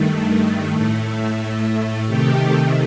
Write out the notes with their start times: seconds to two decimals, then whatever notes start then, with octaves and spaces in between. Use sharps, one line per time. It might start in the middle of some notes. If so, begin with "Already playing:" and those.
Already playing: G2 D#3 A3
0.70 A2 A3
2.06 C3 D#3 A3 G4